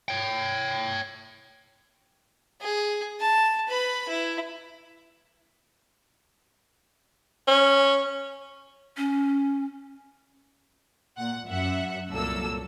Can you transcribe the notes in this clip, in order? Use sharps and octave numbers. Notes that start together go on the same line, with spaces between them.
C#5 G5
G#4
A5
B4 B5
E4
C#4
C#4
A#2 F#5
F#2 E5 F#5 C#7
C2 A#2 F#3 A#3 A4 E6